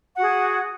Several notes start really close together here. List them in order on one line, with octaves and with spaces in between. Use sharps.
F#5 F#4 G#4